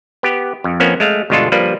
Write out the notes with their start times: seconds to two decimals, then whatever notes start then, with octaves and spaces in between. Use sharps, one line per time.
0.23 B3 G4
0.64 F2
0.80 F2 F3 A#3 B3 C#4
1.00 G#3 A3 F5
1.30 G1 B2 G#3 D4 F4 A4
1.52 F3 G3 A#3 D4 B4